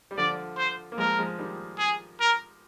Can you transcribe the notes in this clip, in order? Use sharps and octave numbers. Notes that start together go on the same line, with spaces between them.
G3
D3 F3 D5
C5
A#3
F3 G#3 A#4
F3 G#3
D#3 G3
G#4
A#4